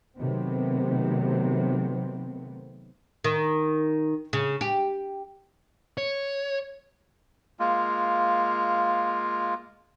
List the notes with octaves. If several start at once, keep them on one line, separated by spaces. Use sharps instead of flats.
C3 D#3 F#3 A3 B3 C4
D#3
C#3
G4
C#5
G#3 A#3 F4